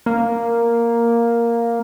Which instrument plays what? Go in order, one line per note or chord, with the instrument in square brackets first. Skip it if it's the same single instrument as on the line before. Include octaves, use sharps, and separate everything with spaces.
[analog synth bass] A#3